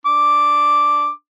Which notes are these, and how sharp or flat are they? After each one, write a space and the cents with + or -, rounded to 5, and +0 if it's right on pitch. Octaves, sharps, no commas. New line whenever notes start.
D4 +0 D6 +0